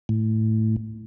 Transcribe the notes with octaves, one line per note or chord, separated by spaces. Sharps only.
A2